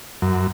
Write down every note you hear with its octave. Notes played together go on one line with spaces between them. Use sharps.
F#2